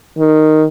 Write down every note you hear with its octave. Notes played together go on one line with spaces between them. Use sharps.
D#3